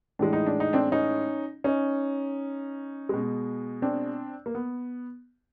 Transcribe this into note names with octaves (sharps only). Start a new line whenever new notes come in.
A2 E3 G#3 D4
D#4
D4
D#4
C4 D4
C#4 D#4
C#4 D#4
B2 G#3
C4 D4
A#3
B3